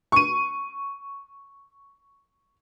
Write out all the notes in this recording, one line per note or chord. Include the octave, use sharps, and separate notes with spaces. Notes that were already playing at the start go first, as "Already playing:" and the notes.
C#6 D#7